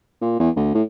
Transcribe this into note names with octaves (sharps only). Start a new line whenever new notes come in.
A#2
E2
D2
A2